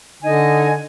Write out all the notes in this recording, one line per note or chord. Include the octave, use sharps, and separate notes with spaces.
D3 D#4 D#5 G#5